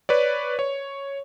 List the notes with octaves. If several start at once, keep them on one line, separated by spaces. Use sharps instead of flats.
B4 C#5 D5
C#5